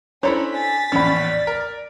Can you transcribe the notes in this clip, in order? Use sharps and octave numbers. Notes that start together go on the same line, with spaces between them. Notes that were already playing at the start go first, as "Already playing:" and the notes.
C#4 D4 E4 A4 C5 C#5 A#5 B5
G#5 A6 B6
A#1 E2 A2 C#4 D5 B5
A#4